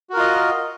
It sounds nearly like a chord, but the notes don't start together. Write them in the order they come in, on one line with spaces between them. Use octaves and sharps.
F#4 A#4 F4 D#5